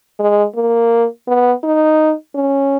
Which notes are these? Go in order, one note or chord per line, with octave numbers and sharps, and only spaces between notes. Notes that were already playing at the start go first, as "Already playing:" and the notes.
G#3
A#3
B3
D#4
C#4